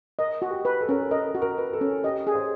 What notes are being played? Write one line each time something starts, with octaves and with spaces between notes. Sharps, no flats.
A#4 D#5
F#4
G4
B4
A4
C#4 A#4
A4
A#4 D#5
F#4
A#4
B4
A4
C#4
G4 D#5
G#4 C#5
C5